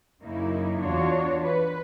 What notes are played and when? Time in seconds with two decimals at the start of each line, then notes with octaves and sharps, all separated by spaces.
0.22 F#2 C#3 A#3 D#4 E4
0.80 E2 D4 F4 F#4 C#5
1.42 B4